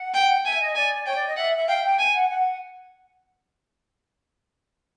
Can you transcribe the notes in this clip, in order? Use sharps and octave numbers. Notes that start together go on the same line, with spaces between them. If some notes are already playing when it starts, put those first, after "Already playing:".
Already playing: F#5
G5
E5 G#5
D#5
D5 G#5
C#5 G5
D5
D#5
E5 F#5
E5
F5 G5
G5
G#5
F#5
F#5